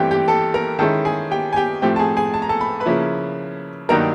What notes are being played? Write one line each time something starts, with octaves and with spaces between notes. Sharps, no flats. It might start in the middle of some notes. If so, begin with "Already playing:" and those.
Already playing: G2 E3 A3 C4 G4 G5
G4 G5
A4 A5
A#4 A#5
D#3 G#3 C#4 E4 A4 A5
G#4 G#5
G4 G5
G#5
G4 G5
A2 F3 A3 C4 G4 G5
A5
G#4 G#5
G#4 G#5
A5
A#5
A4 A5
B5
B4 B5
C#3 F3 A#3 C#4 E4
G2 D#3 F#3 A#3 D#4 A#4 A#5